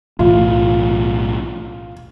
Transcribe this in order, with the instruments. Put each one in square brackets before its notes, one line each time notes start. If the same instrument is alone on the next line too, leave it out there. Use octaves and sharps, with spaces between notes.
[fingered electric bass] B1 A2 E3 [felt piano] F4